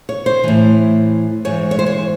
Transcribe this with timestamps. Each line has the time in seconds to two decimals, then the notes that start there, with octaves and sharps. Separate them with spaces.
0.09 C#5
0.26 C5
0.44 A2 E3
1.45 G#2 E3 C#5
1.71 C#5
1.79 C5
1.86 C#5